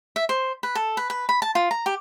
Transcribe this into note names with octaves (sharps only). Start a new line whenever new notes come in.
E5
C5
B4
A4
B4
B4
B5
A5
F4
A#5
G4